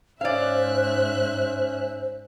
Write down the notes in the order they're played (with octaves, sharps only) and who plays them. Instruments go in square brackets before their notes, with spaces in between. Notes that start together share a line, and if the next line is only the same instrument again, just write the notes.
[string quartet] G#2 E5 F#6 [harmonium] C#4 [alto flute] C5 [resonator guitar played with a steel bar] D5 F5